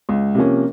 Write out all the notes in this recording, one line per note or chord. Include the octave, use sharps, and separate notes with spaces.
C#2
C3 F3 A#3 C#4